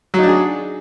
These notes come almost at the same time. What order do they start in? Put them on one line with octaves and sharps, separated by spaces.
F#3 D#4 D4 G#4